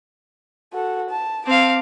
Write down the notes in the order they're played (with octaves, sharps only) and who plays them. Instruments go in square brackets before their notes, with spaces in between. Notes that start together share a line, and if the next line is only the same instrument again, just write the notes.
[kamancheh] F#4 A4
A5
[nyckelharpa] C4 F5 [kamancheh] A5 D6